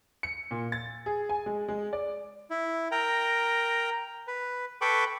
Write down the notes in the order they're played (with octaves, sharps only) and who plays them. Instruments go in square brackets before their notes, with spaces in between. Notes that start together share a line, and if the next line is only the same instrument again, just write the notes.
[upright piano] C#7
A#2
A6
G#4
G#5
G#3
G#3
D5
[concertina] E4
A#4 G5 A#5
B4
A4 B4 G5 B5 C#6 D6